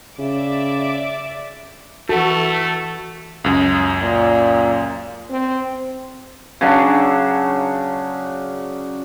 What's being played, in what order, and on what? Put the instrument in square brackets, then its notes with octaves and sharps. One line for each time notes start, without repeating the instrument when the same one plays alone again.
[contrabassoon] C#3 [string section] D5 E5 D6
[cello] E3 [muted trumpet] A3 [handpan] F#4 [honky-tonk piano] A4
[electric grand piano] C#2 F#2
[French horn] A#2
C4
[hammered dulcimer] C#3 F#3 D4